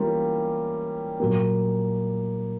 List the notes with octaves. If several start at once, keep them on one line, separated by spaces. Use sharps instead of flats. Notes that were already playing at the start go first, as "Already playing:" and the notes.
Already playing: E3 G3 A#3 C#4 F4
A#2 F#3 A#3